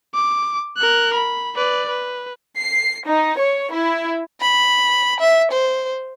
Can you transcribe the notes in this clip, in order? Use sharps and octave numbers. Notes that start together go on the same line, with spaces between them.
D6
A#4 F#6
B5
B4 D5
B4
C7
D#4
C#5
E4
B5
E5
C5